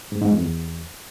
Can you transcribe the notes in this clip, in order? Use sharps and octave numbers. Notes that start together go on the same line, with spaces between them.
G#2
G#2
F2
E2